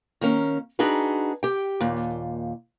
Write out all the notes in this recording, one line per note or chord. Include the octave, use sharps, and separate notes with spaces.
D#3 A#3 C#4
D4 D#4 F#4 G#4 B4
G4 G5
D#2 A#2